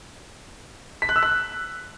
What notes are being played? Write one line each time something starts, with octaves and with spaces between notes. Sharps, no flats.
B6
F#6
E6
F#6